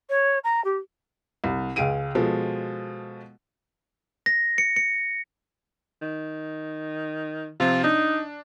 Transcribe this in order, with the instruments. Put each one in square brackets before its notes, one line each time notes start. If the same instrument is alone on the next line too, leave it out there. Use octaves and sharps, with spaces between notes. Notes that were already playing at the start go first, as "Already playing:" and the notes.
[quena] C#5
A#5
G4
[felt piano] C2
C#2 G#4 F5 D7 D#7
B2 F3 G#3 A4
[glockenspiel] A#6
C#7
C#7
[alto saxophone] D#3
[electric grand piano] C3 F3 C4 [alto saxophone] F4
[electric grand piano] D4 [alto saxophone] D#4